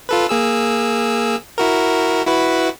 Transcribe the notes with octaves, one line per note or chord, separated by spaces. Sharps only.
F4 A4 B4
A#3 G#4 E6
E4 F#4 A#4
E4 F#4 B4